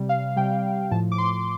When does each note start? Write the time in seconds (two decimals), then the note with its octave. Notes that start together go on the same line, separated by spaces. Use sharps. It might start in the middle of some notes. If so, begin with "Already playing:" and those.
Already playing: C3 G3
0.09 F5
0.36 C3 G3 G5
0.91 A2 F3 A5
1.12 D6
1.18 C6